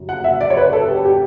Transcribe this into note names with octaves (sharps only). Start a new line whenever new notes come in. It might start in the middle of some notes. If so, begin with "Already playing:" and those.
Already playing: F#2 C#3 G3
F#5
E5
D5
C#5
B4
A4
G4
G4